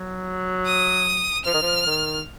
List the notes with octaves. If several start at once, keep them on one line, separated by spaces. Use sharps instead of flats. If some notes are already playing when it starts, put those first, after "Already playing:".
Already playing: F#3
D#6
F3 F6
D#3
F3
D#3